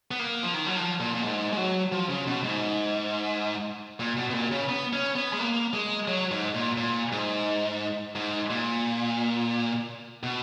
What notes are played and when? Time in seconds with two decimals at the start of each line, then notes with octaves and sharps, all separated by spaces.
0.11 B3
0.19 A#3
0.43 F3
0.54 D#3
0.66 F#3
0.76 F3
1.00 A#2
1.14 A#2
1.23 G#2
1.53 G#3
1.57 F#3
1.92 F3
2.09 C#3
2.27 B2
2.44 G#2
4.00 A#2
4.17 B2
4.30 B2
4.34 A#2
4.51 C#3
4.69 B3
4.93 C#4
5.16 B3
5.33 G#3
5.39 A#3
5.73 G#3
6.08 F#3
6.31 G#2
6.54 A#2
6.77 A#2
7.12 G#2
8.16 G#2
8.50 A#2
10.23 B2